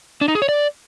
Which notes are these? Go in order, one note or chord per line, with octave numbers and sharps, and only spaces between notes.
D4
D#4
G#4
C#5
D5